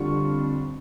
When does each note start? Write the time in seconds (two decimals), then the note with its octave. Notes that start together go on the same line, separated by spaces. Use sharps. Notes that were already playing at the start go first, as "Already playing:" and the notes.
Already playing: F2 D3 G3 D4 F4 C#6